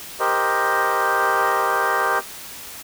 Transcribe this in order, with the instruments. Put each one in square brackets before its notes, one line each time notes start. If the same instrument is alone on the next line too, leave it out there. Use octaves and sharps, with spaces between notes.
[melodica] G4 A#4 C5 D#5